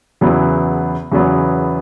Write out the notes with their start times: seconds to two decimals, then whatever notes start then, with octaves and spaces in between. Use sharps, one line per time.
0.21 E2 C#3 F#3 B3 E4
1.12 E2 C#3 F#3 B3